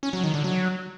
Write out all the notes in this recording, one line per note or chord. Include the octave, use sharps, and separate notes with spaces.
C#4
F#3
D#3
D3
F#3